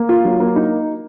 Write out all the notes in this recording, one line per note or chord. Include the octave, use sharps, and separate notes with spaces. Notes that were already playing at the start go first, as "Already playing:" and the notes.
Already playing: A#3
F4
F#3
A#3
D#4